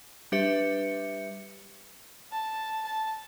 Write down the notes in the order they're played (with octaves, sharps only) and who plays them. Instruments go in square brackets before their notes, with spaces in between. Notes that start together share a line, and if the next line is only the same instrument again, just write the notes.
[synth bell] G3 D4 G4 B4 E5 C#7
[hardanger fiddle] A5
A5